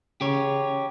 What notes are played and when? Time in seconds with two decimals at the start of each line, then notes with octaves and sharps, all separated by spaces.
0.21 C#3 G4 C#5